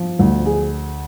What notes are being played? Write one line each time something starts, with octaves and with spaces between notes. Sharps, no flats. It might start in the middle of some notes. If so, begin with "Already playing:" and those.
Already playing: F3
D2
G#4